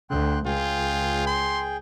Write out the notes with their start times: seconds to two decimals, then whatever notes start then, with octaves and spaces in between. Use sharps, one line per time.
0.10 D2 G5 C6 F#6
0.46 C#2 F4 G#4 G5
1.27 C6